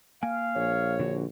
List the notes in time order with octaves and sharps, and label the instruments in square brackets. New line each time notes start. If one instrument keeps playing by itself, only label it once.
[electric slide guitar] A#3 G5 G#5 [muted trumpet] F5
[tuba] A#1 [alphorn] C#5
[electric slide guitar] D3 F#4